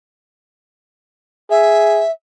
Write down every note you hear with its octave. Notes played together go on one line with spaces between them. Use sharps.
G#4 E5